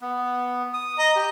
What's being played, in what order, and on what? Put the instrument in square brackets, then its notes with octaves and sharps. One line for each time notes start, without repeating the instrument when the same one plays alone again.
[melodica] B3
D#6
[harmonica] D#5 A#5
G4